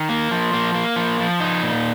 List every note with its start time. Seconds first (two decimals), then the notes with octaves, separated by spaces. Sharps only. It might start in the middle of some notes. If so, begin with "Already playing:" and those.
Already playing: D#3
0.09 A#3
0.31 F3
0.53 A#3
0.74 A#3
0.96 F3
1.19 F3
1.40 D#4
1.63 A#2